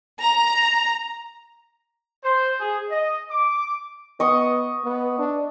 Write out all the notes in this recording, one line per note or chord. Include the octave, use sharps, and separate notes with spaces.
A#5
C5
G#4
D#5
D6
B3 D#5 C#6 D#6
B3
D4